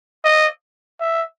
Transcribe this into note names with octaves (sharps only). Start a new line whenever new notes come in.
D#5
E5